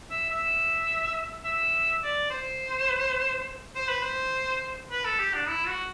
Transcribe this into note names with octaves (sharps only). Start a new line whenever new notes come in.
E5
E5
E5
D5
C5
C5
B4
C5
B4
A4
G4
D4
E4
F#4